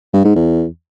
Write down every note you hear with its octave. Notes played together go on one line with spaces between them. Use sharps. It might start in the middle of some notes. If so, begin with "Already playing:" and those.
G2
G#2
E2